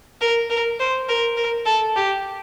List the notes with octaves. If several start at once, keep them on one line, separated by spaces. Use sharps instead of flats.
A#4
A#4
C5
A#4
A#4
A4
G4